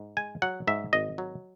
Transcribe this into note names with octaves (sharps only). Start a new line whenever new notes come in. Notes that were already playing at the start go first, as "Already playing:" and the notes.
Already playing: G#2
G#3 G#5
F#3 F#5
G#2 E5
G#1 D#5
F#3